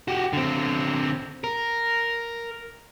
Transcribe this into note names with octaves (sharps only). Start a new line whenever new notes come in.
F#4 G4
D3 C4
A#4